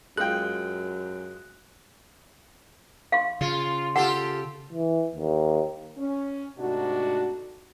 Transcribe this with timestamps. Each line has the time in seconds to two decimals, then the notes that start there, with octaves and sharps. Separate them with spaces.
0.17 F#2 G#3 F4 G5 F#6
3.12 F5 C6
3.41 C#3 F4
3.96 F4 G4 A4 F#5
4.73 E3
5.15 D#2
5.98 C#4
6.58 G#2 C3 A3 D4 D#4 F#4